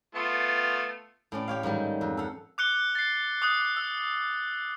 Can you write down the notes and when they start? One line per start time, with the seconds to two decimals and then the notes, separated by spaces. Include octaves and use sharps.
0.15 A3 B3 F4
1.32 A2 C#4 D5
1.48 G4 C#5 F5
1.63 G#2 D#3 F#3 G3
2.01 F2
2.17 A4 F5 F#5
2.58 D6 F#6 C#7 G7
2.95 A6 C7
3.42 D6 D#6 F#6
3.76 E6